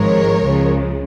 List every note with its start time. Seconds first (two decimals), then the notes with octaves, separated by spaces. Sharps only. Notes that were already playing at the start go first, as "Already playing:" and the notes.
Already playing: G#1 G#2 F3 G#3 A#4 C#5
0.45 C#2 C#3 F3 G#3